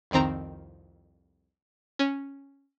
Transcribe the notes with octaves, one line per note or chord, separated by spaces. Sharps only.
C2 F2 D#3 C4 A#5
C#4